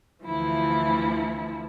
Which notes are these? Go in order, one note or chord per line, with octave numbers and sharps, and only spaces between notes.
D2 D3 E3 F3 E4